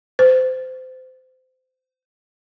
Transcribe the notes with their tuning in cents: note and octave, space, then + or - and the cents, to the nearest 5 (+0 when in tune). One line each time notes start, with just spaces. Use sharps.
C5 -25